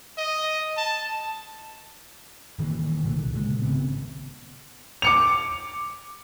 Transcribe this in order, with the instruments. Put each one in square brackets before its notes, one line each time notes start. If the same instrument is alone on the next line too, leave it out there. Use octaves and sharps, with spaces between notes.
[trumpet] D#5
A5
[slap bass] D#1 D#3 E3 A#3
C2 A#2 D3
A#2 C#3 G#3 A#3
G#1 C#3 B3 C4
[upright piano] D6 C#7 F7